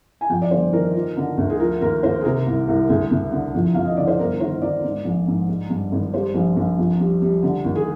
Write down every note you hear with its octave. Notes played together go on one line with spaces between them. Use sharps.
G#5
F2 G5
D5
G1 C5
D#3 A#4
F3
D3
D2
G#4
F3 A#4
D#2 A#4
D#2 C5
G#4
C3 A#4
C2
C2
D2 G#4
D2
D3
F2
F2 F5
D#5
D3 D5
C5
G1 A#4
D#3 C5
D#3 D5
G#2
A#1
G#2
G#3
G2
G#1
G3 C5
A#1
A#1
F2
G3
G3
D3
D#2
G#4